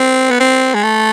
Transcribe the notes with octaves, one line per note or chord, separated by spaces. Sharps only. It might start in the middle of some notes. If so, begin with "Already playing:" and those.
Already playing: C4
B3
C4
G#3
A3